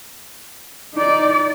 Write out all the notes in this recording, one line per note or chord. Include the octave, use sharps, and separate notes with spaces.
D#4 D5